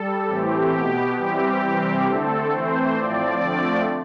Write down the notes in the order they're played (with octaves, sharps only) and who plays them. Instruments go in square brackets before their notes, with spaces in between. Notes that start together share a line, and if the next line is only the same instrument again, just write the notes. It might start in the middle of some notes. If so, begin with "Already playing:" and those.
Already playing: [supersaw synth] G3 A4
A2 E3 A3 C4 G4
B2 B3
E3 G3 C4 G4
C3 E3 G3 C4
D3 A3 C4 A4
E3 A3 C4 C5
A2 F3 C4 D5
D3 F3 A3 C4